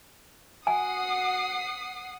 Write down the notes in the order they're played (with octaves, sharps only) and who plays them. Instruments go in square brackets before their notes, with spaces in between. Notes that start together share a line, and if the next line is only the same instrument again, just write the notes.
[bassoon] F#4 [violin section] F#5 D#6 C7 [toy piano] G#5